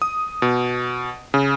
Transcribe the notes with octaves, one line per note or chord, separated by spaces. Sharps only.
D#6
B2
C#3